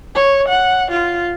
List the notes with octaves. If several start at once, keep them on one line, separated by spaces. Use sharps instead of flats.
C#5
F#5
F4